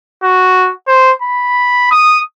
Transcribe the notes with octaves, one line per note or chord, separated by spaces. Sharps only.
F#4
C5
B5
D#6